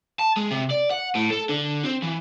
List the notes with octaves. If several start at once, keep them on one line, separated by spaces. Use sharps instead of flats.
A5
G#3
C3
D5
F#5
A2
A4
D3
C4
E3